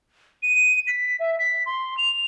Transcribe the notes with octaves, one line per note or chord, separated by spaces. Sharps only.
D#7
B6
E5
B6
C6
F7